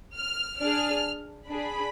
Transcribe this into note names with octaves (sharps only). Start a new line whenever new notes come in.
F6
D4 G#4 F6
D4 G#4 B5